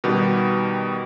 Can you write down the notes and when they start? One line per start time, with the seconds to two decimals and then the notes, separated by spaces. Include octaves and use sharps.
0.04 B2 D#3 G3 B3 G4